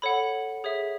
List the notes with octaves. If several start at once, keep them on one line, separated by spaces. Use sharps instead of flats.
A4 C#5 F#5 B5
G#4 C#5 E5